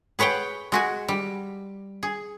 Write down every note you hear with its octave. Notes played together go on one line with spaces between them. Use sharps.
G#4 B4 C#5 F#5 G5
G#3 F#4 G#5
G3
G#4